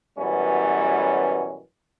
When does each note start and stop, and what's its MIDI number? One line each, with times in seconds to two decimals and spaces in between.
0.18 1.60 42
0.18 1.60 47
0.18 1.60 52
0.18 1.60 55
0.18 1.60 61